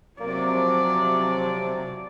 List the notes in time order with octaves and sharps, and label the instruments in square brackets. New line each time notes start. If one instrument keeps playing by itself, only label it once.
[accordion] C3 [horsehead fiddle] F#3 D5 [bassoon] A#3
[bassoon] F3